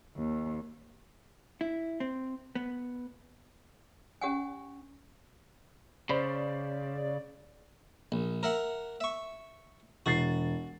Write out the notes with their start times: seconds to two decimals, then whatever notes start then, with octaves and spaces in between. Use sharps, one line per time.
0.16 D#2
1.61 E4
2.00 C4
2.55 B3
4.21 C#4 G4 F#5 G#5
6.09 C#3 C5 D5 B5
8.12 A#1
8.43 A#4 E5 F#5
9.01 E5 C#6
10.06 E1 F#4 A6 C7